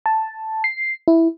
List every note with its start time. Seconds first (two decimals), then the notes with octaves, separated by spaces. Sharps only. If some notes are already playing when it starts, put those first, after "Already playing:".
0.06 A5
0.64 C7
1.08 E4